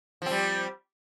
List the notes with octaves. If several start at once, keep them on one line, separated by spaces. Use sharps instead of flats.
F3 G3 C4